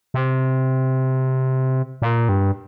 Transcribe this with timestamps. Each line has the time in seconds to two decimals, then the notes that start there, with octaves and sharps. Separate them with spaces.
0.14 C3
2.02 A#2
2.29 G2